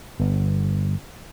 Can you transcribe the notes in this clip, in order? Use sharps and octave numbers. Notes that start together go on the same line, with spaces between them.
G1 B3